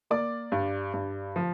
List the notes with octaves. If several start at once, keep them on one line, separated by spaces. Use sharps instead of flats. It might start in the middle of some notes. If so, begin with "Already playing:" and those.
A#3 D5 D6
G2
G2
F3